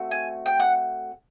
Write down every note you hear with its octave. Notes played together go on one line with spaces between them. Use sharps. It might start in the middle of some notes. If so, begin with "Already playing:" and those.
Already playing: A3 C4 F#4
G#5
G5
F#5